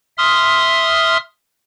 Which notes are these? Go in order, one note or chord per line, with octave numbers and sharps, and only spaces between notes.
E5 C6 D#6 F6